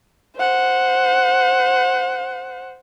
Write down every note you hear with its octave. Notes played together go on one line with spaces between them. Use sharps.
C5 F#5